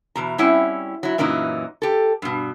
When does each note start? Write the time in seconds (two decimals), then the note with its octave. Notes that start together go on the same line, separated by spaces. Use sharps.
0.15 E2 B2 A#5
0.38 G3 C4 C#4 E4 F#5
1.03 F#3 E4
1.18 F#2 A#2 E3 F#3 D#4
1.82 G4 A4
2.22 G2 B2